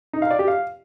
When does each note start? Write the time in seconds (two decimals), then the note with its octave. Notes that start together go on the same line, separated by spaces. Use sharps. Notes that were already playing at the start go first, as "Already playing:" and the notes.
0.13 D#4
0.22 F5
0.31 D5
0.39 G4
0.48 F5